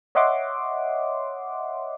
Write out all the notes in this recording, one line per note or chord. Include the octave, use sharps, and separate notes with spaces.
C#5 D#5 E5 F#5 C6 D6